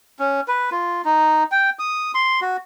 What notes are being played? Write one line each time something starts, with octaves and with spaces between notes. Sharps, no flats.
C#4
B4
F4
D#4
G5
D#6
C6
F#4